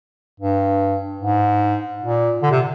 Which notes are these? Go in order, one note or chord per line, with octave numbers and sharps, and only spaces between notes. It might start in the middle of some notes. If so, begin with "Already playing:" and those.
G2
G#2
A#2
D3
C3